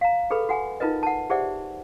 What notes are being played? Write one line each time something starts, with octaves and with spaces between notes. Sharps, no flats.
F5 A#5
G#4 A4 B4 B5
F#4 F#5 G#5
D#4 F4 A#4 B4 D#5
F#5 A5
G4 G#4 C5 D5 E5 F#5